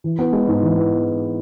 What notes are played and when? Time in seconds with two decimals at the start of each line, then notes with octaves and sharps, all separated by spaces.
0.04 E3
0.19 B3
0.33 G#3
0.48 G#2
0.63 E3
0.77 B3